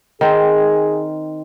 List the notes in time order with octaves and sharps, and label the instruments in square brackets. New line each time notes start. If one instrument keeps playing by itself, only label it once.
[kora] D#3 C4 [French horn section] G#4